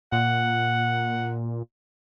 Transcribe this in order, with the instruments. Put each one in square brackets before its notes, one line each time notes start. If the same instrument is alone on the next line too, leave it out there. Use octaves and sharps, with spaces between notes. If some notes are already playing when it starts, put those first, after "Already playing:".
[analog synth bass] A#2 [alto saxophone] F#5